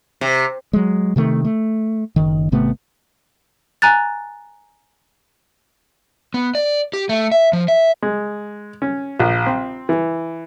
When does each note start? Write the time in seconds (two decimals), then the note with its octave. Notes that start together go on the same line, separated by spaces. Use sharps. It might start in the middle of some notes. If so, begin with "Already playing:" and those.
0.21 C3
0.73 F#3 G#3
1.16 C3 D#3 A3
1.45 A3
2.16 F#1 D#3
2.52 G#1 C3 A3 B3
3.82 G#5 A#5 F#6 A6
6.34 B3
6.55 D5
6.93 G4
7.09 A3
7.32 E5
7.53 F3
7.68 E5
8.02 G#3
8.82 C#4
9.19 A#1
9.46 C4
9.89 E3